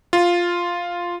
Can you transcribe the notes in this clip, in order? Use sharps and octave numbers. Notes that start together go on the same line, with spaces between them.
F4